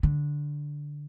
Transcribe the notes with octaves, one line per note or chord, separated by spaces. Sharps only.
D3